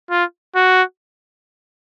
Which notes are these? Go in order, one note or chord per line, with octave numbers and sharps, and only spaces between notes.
F4
F#4